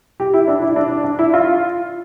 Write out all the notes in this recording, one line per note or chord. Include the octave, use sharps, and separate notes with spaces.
G4
E4
D4
E4
D4
D4
E4
F4